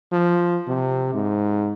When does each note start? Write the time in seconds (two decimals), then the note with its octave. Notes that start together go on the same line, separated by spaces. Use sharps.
0.12 F3
0.68 C3
1.14 G#2